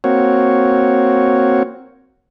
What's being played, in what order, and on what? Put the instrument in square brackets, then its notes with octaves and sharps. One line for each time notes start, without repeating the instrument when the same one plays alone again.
[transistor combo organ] A#3 C4 F#4 C#5